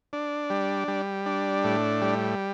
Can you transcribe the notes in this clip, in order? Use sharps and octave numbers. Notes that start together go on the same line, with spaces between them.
D4
G3
G3
D4
A2
G3